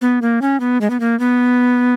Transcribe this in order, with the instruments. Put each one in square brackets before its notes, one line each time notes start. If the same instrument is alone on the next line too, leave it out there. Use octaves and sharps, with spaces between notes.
[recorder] B3
A#3
C#4
B3
G#3
B3
A#3
B3